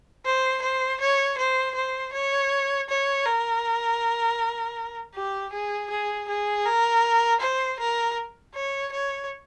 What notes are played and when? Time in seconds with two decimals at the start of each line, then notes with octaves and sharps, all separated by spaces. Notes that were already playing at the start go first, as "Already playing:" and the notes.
0.25 C5
0.62 C5
1.00 C#5
1.37 C5
1.75 C5
2.13 C#5
2.89 C#5
3.26 A#4
5.15 G4
5.52 G#4
5.90 G#4
6.28 G#4
6.65 A#4
7.41 C5
7.79 A#4
8.54 C#5
8.92 C#5